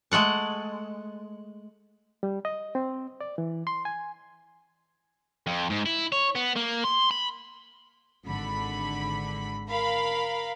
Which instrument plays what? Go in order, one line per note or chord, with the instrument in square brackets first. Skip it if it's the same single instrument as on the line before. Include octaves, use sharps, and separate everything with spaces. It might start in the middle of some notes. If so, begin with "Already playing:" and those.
[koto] G#3 A3 F#5 A5
[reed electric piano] G3
D#5
C4
D5
E3
C6
G#5
[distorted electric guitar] F2
G#2
E4
C#5
B3
A#3
C6
B5
[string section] G#1 D3 B5
A#4 F5 B5